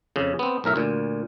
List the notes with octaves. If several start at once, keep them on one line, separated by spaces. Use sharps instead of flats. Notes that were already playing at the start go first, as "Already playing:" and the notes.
F2 C#3
B3 C4
B1 A2 A#4 E5
D2 A#2